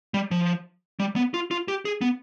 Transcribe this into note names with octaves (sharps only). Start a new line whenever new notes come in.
G3
F3
G3
B3
F4
F4
G4
G#4
B3